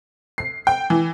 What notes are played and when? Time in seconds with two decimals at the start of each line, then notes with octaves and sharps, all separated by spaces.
0.38 C7
0.67 G5
0.90 E3